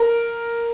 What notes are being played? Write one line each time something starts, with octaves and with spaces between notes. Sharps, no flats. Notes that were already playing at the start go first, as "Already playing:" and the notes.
Already playing: A#4